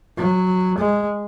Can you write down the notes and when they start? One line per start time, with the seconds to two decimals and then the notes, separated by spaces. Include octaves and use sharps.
0.18 F#3
0.78 G#3